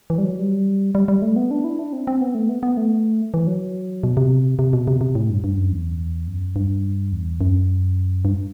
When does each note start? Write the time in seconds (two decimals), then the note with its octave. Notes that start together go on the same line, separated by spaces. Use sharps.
0.10 E3
0.18 G3
0.24 F#3
0.39 G3
0.95 G3
1.08 G3
1.22 A3
1.36 B3
1.51 D4
1.64 E4
1.79 D4
1.93 C4
2.07 C4
2.21 B3
2.35 A3
2.49 B3
2.63 B3
2.77 A3
3.34 E3
3.47 F#3
4.03 B2
4.17 C3
4.59 C3
4.73 B2
4.88 C3
5.01 C3
5.15 A2
5.30 G2
5.44 G2
5.58 F#2
5.72 E2
6.27 F#2
6.56 G2
7.12 E2
7.41 F#2
8.25 G2